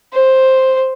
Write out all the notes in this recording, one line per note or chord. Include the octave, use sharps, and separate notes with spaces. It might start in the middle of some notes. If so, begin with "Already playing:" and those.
C5